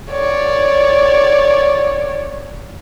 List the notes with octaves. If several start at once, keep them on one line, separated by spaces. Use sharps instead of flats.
C#5 D5